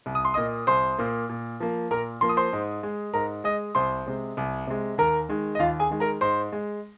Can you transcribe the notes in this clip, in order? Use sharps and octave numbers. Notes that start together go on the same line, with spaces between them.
C2
D#6
C6
A#2 A#3 D#5 D#6
C2 C5 C6
A#2 A#3
A#2
F3 A#3
A#2 A#4 A#5
F3 A#3 C6
D#6
C5 C6
G#2
G#3
G#2 A#4 A#5
G#3 D#5 D#6
C2 C5 C6
C3 G#3
C2
C3 G#3
D#2 A#4 A#5
D#3 G#3
D#5
D#2 F4 F5
G#4 G#5
D#3 G#3
A#4 A#5
G#2 C5 C6
G#3